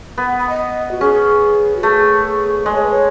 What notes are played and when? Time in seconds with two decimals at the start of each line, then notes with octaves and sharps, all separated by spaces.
0.18 B3
0.39 B5
0.49 D#5
0.91 F#4
1.01 C#4 G#4
1.76 F#4
1.83 A3 G#4
2.66 G#3 D#5
2.75 C#5
2.83 B4
2.91 C#5